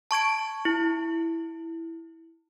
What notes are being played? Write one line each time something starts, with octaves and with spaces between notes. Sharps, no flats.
A5 C#6 G#6 D7
E4